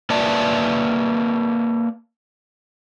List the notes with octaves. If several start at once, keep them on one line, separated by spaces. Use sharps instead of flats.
A#3 B4 D5 E5 A5